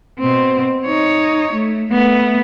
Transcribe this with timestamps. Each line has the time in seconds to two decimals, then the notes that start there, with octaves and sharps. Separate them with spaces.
0.19 B2 C4
0.86 D#4 C#5
1.53 A3
1.91 A3 B3